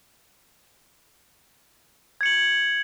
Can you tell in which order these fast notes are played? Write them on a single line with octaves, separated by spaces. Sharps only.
G#6 C#7 F#7